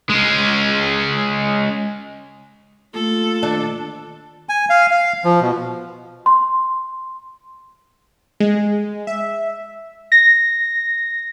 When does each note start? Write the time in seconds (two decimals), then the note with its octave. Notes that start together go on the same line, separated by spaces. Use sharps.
0.10 G#3 C#4
2.94 A3 A#3 F4 A4
3.43 D#3 D4
4.49 G#5
4.70 F5
4.91 F5
5.24 F3
5.41 B2
6.26 C6
8.40 G#3
9.07 E5
10.12 A#6